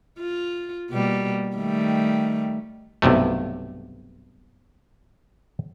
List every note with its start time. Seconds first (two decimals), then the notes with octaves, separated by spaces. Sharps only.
0.19 F4
0.90 B2 G3 A#3
1.56 D#3 G3 A3
3.02 B1 G2 C3 A3